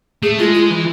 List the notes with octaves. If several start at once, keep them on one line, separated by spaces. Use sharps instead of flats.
A3 G#4
G#3 F4
F4
E3